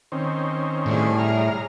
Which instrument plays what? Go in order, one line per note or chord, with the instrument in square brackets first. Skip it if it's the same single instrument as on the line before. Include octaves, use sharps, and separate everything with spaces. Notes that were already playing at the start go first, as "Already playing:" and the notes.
[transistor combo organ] D#3 C4 C#4
[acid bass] A2 [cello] G3 G#4
[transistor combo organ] A#5 F6